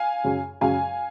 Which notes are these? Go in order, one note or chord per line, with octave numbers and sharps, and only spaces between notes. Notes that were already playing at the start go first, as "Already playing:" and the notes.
Already playing: F5 G#5
F#2 C#3 F#3
F#2 C#3 F#3 F5 G#5